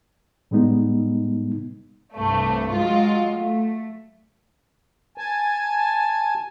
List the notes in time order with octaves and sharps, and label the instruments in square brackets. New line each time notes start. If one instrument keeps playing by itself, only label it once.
[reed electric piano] A2 G3 G#3 B3 D#4
[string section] C2 G2 A3
F#3 G#3 F4
A3
[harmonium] G#5 A5